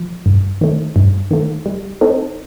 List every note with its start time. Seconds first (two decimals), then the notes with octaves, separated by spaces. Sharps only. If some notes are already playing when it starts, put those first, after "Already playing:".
Already playing: F3
0.26 G2
0.61 D#3 A3
0.96 G2
1.31 D#3 A3
1.66 G3
2.01 C4 D#4 A4